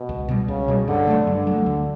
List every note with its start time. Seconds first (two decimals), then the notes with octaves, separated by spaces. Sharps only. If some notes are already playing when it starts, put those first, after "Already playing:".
Already playing: B2
0.09 C#2
0.28 B2 G3
0.48 C#2 C#3
0.68 B2 G3
0.88 G2 D3
1.07 F#3 A3
1.27 G2 D3
1.47 F#3 A3
1.66 D2